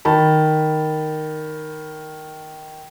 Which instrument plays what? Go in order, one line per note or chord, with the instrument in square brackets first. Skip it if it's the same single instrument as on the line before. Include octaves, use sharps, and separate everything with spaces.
[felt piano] D#3 A5 B5